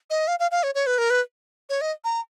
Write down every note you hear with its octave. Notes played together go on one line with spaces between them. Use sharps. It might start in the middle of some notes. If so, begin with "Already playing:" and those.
D#5
F5
F5
F5
C#5
C#5
B4
A#4
B4
C#5
D#5
A#5